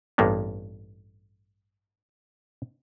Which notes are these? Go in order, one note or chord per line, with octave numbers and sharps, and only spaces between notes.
A1 G2 A#3 B3